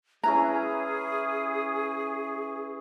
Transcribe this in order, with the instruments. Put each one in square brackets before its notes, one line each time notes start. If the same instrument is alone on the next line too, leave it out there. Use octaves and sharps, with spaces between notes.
[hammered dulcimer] C#4 E4 B4 [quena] G#4 [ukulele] A#5